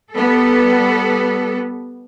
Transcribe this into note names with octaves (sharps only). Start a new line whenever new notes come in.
G3 B3 A4